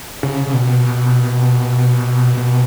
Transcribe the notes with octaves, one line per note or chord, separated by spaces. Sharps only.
C#3
C#3
B2
B2